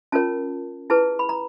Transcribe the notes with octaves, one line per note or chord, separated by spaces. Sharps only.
C#4 F4 A#4 C#5 A5
E4 G#4 B4 A5
B5
A#5